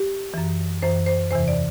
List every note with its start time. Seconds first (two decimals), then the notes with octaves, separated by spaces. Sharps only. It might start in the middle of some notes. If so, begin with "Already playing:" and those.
Already playing: G4
0.34 F#2 E3
0.82 F#2 E3 C5
1.06 C5
1.31 E2 C3 E3 C5
1.48 D5